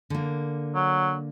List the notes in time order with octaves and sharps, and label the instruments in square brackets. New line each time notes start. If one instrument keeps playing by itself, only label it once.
[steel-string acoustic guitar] D3 A#3
[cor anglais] F#3